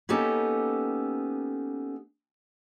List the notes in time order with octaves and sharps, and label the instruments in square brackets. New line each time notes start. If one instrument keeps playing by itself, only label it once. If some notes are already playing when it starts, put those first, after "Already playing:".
[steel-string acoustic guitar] A#3 B3 C#4 D#4 G4 A4